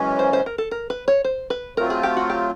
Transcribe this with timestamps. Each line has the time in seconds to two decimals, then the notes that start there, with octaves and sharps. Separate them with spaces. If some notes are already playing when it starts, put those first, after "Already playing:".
Already playing: F#2 C#3 E3 G#3 C#4
0.19 C5
0.33 C5
0.46 A#4
0.58 A4
0.71 A#4
0.90 B4
1.08 C#5
1.24 C5
1.50 B4
1.77 F#3 A3 C4 F4 A#4
1.90 G#4
2.03 G4
2.17 F#4
2.30 G4